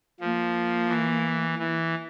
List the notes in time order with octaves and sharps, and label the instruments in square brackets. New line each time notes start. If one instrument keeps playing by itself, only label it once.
[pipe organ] F3 [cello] A#3
[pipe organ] E3
E3